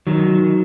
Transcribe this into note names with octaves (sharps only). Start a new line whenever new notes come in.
D#3 F#3